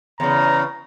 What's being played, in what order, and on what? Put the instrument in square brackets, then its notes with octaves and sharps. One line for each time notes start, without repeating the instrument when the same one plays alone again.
[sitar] E2 C#3 [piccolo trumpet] A#5